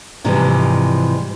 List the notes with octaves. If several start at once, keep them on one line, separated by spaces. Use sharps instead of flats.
G#2 C3 E3 F3 G3 G#3